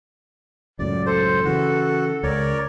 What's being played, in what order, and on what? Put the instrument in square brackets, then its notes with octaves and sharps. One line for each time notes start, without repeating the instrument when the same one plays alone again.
[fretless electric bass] C#2 F#2 A2 [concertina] D5
[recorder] A4 [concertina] C5
[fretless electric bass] C#3 E3 [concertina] F#4
[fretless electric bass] C#2 [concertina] A#4 C#5 D5